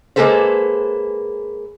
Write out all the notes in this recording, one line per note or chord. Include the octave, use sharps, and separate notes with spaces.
G#3 A#3 G#4 A4 B4 C5